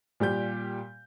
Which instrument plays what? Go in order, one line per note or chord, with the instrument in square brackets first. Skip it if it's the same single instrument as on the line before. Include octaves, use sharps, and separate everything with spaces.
[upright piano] A#2 G3 G4 G6